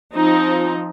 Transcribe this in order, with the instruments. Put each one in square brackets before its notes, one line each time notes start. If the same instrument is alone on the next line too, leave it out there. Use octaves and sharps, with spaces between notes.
[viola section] F3 C4 D#4